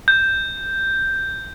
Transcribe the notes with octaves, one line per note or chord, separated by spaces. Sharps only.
G6